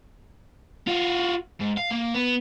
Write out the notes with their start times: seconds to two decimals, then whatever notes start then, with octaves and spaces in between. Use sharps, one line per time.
0.87 F4 F#4
1.61 G#2
1.78 F5
1.91 A#3
2.14 B3